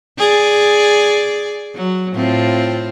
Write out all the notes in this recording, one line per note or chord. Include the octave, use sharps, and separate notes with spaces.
G#4 D5
F#3
A2 C4 F4